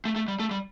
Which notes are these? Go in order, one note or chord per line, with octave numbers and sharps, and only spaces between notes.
A3
A3
G3
A3
G3